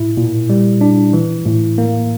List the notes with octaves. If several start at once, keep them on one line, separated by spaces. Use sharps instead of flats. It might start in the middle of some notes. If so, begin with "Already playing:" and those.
Already playing: A2 E4
A#2
G3
D4
E3
A2
A#3